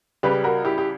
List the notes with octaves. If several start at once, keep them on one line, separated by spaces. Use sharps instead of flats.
C#2 C#3 G3 G4 B4
F#4 A#4
E4 G4
G4